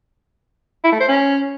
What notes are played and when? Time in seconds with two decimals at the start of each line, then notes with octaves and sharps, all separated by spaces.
0.84 E4
0.92 A3
1.00 C5
1.08 C#4